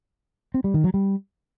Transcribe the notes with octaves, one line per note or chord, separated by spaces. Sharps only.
C4
G3
D#3
F#3
G3